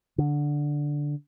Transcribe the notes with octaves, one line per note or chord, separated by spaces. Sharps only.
D3